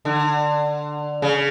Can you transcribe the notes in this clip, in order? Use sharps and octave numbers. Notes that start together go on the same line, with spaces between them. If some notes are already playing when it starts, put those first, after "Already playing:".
D3
C#3